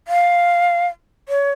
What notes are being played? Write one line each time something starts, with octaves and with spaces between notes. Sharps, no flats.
F5
C#5